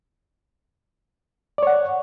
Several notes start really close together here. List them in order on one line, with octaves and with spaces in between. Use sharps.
D5 C#5 F#5